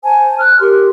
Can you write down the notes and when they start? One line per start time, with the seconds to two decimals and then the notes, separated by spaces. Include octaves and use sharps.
0.04 C5 G#5 A5
0.40 F6 F#6
0.60 G4 A#4 C6